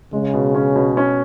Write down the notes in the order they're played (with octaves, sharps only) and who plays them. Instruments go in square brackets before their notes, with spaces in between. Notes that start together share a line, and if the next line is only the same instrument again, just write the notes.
[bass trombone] C#3 [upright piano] G#3
[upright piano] B2
C#4
B2
C#4